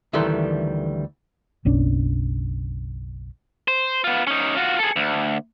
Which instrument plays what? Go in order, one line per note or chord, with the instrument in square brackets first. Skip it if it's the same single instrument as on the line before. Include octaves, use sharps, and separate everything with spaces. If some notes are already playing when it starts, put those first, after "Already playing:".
[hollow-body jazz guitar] D2 D#3 E3 G3 A4 C6
[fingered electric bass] F#1 B1 C#4 D4
[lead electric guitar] C5
B3 F4
C#4 D#4
F4 F#4
G#4 A4
D2